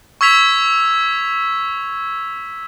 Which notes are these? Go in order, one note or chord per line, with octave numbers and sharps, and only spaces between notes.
C#6 E6 G#6 B6 F7